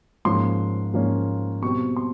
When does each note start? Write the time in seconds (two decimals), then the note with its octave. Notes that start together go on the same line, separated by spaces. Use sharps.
0.25 G#2 F3 A#3 C#4 C6
0.94 G#2 F3 A#3 C#4
1.62 B2 G3 C4 C#6
1.96 C6